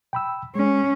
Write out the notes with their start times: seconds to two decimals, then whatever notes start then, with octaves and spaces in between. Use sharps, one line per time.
0.13 G5 B5 E6
0.55 G#3 C#4